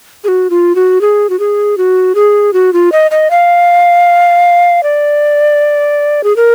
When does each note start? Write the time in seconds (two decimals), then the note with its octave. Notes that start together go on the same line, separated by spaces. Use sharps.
0.24 G#4
0.28 F#4
0.50 F4
0.75 F#4
1.01 G#4
1.30 F#4
1.40 G#4
1.78 F#4
2.15 G#4
2.53 F#4
2.73 F4
2.92 D#5
3.11 D#5
3.31 F5
4.83 D5
6.24 G#4
6.36 A#4